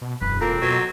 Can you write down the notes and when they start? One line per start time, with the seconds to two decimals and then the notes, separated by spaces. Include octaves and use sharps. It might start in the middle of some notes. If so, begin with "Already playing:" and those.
0.01 B2
0.21 E1 F#2 B4
0.41 A#3 C4 F4 A4 A#5
0.62 B2 F#3